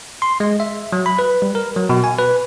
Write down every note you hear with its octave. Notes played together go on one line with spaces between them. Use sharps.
C6
G#3
E5
F#3
B5
B4
G3
A#4
F#3
B2
G#5
B4